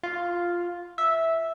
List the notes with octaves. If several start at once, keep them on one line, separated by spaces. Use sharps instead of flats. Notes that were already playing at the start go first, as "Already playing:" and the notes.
F4
E5